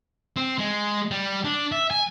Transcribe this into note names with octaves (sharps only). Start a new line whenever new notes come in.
C4
G#3
G3
D4
E5
G#5